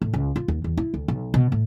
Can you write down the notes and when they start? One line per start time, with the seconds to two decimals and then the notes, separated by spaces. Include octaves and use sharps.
0.02 A2
0.14 C#2
0.36 F4
0.48 D#2
0.64 E2
0.77 E4
0.94 D2
1.08 B1
1.34 B2
1.52 A2